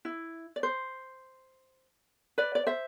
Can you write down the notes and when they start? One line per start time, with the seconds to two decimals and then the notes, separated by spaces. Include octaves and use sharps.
0.05 E4
0.56 D5
0.63 C5
2.38 B4 D5
2.55 D5
2.67 C5 E5